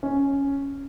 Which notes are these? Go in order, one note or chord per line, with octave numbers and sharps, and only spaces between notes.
C#4